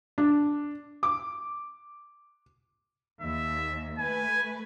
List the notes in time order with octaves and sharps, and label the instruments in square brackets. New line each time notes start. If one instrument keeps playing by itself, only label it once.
[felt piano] D4
D6
[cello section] D#2 [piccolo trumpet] E5
[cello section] A3 B4 [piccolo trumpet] G#5